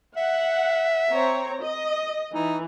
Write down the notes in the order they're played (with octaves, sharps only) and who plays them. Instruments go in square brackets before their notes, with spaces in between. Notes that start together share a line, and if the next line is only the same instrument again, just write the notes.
[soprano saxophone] E5 [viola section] F#5
[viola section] C4 C#5 A#5
D#5
[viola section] E3 [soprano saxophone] D#4